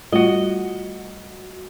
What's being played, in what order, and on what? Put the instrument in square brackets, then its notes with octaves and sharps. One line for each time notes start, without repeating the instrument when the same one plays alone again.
[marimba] G3 A3 F4 [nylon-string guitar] F#4 D#5